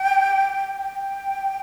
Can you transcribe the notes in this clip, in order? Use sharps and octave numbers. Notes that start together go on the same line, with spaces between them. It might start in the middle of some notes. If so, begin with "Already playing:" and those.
Already playing: G5
G5